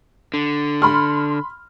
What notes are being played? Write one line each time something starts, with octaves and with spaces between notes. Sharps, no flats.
D3
B5 C6 F6